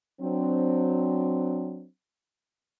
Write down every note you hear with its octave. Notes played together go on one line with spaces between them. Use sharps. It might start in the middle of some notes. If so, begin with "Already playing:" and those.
F#3 C4 D4